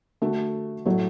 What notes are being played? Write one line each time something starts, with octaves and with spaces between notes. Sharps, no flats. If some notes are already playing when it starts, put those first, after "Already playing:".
D3 A3 F#4 A4
A2 F#3 A3